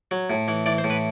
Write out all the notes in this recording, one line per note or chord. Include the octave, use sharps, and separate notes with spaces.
F#3
A2
E3
E3 D5
C5
A2
B4